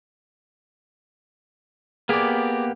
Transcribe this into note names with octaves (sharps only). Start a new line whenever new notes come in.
A#3 B3 G4 G#4 D5